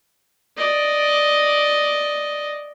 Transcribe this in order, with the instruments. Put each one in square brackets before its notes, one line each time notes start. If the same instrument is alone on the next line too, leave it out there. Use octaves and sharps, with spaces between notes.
[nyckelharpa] D5 D#5